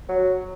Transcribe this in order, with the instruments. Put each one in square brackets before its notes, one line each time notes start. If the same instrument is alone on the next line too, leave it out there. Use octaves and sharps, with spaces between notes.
[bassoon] F#3